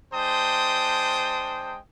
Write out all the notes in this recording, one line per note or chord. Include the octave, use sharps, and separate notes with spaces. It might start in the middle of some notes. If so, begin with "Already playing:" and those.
G#3 D4 C5 G5 A5 D#6